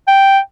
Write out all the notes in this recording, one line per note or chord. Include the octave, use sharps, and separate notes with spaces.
G5